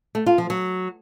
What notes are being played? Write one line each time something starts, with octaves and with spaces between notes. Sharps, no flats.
A3
F4
F3
F#3